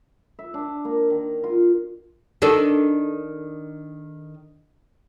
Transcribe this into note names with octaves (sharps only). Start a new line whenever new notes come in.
E5
D4
A#3
D#3
F4
D#3 D4 A4